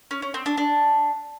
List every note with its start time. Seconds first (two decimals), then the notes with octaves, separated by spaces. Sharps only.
0.11 C#4
0.22 C#4
0.34 C4
0.46 D4
0.58 D4